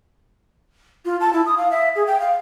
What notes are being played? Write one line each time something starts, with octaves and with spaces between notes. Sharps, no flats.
F4
A5
E4
D#6
F5
E5
G#4
G5
F5